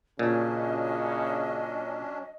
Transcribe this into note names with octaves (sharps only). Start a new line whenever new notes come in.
A#2 C#3 F#3 C#4 D4 D#5